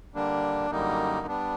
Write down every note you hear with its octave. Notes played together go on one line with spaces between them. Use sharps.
D3 G3 A#3 D4
F#2 D3 G3 A#3 D#4
G3 B3 D4